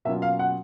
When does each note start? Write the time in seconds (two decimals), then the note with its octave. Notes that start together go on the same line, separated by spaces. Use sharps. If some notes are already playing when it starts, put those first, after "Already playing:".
0.05 B2 F#3 A#3 C#4 F4 E5
0.22 F5
0.39 F#5